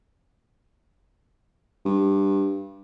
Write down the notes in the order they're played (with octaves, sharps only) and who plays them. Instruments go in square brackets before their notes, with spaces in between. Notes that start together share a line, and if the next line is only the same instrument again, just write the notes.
[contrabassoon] G2